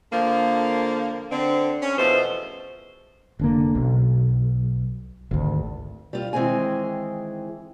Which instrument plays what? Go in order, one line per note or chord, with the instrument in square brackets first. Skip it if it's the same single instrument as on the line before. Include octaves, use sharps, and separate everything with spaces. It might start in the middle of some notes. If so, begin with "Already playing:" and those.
[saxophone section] D3 F3 A#3
D3 C4
C#4
E2 B2 F3 A3 C5
[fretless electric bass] F1 D3 A#3
B1
G#1 D2
[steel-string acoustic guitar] G3 F4
D#3 E3 G#3 C4 G#4 G#5